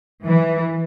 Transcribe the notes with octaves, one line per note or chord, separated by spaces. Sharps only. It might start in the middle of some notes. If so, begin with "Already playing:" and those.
E3